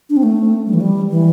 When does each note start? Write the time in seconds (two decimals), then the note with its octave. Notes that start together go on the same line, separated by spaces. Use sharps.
0.10 D4
0.17 C4
0.23 A3
0.67 G3
0.74 E3
0.81 G3
1.10 E3